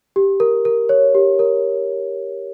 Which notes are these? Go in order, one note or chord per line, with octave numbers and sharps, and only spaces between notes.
G4
A#4
A#4
C#5
G4
A#4